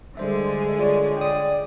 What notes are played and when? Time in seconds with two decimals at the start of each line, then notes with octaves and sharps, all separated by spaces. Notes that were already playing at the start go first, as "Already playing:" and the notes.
0.17 D3 G3 G#3 C5 E5
0.79 F4 G#4 C#5 D5
1.17 D5 G5 D#6